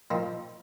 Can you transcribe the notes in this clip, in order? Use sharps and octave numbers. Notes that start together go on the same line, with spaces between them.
A#2 F3 C4 D#4